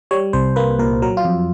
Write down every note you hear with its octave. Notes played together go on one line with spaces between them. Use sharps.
G3 C#5
C2 C5
A#3 B4
A#2 A#4
F#3 A#4
F4
F2